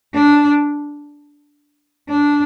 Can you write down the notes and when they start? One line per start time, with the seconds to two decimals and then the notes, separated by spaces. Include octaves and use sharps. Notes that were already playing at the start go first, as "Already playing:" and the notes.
0.14 D4
2.09 D4